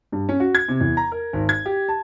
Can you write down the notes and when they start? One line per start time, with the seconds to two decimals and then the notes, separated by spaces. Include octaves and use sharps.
0.12 G2
0.29 C#4
0.40 F#4
0.55 G#6
0.68 C3
0.81 E2
0.97 A#5
1.12 A#4
1.33 G#1
1.49 G#6
1.66 G4
1.89 A5